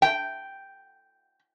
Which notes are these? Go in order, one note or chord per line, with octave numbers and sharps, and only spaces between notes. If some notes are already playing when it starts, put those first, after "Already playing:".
G5